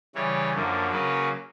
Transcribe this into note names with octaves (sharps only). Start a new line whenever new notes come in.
C#3 E3 G3 C#5
F#2 D3 F3 A#3
C#3 F#3 A#3 C#4 B4